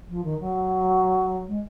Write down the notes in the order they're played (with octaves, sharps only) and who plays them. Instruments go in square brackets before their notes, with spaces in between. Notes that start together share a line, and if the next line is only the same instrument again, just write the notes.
[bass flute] F3
D#3
F#3
G#3